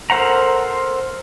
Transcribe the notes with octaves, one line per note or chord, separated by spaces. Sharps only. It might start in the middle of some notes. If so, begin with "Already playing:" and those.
A4 A#4 C5 F#5 A#5